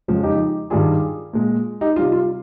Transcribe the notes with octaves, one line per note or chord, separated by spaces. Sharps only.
F2 C#3 F3 G#3
D#4 G4
G2 D#3 G3 F4 G#4
A#2 G#3
D#4 G4
C3 G3 F4
F4